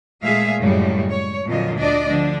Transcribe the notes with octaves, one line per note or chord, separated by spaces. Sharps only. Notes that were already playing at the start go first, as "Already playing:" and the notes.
A#2 G#3 A3 G#4 E5 F5
F#2 A2 C#3 G3 G#3
C#5
F2 A#2 D3 F#3 F4 D#5
D2 D4 D5 D#5
D3 F3 D4